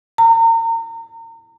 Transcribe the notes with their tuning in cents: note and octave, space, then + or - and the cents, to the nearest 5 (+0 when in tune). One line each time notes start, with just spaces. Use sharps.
A#5 -35